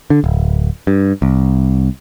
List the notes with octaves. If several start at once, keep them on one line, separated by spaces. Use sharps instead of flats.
D3
D1
G2
C2